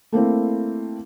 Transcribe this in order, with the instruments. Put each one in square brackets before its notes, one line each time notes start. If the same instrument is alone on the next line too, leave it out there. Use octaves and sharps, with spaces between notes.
[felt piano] A3 A#3 C4 E4